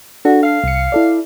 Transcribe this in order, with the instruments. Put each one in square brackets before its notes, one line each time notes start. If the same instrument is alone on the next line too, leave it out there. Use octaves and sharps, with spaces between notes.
[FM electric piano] D4 A4 [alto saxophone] F#4
[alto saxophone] F5
[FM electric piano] C2 C#7
E4 A4 D5